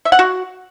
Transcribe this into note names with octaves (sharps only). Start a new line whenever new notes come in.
E5
F#5
F#4